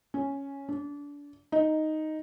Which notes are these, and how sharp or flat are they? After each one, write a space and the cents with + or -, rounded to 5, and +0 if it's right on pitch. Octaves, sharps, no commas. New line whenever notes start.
C#4 +0
D4 -30
D#4 +0